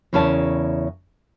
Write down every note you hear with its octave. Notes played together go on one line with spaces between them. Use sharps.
E2 C#3 C#4 E4 A#4 A5